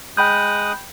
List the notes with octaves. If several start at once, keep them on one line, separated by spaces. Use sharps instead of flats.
G#3 G5 B5 D#6 F#6 G6